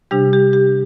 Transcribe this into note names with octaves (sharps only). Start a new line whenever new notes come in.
C3 G3 D4 G4
G4
G4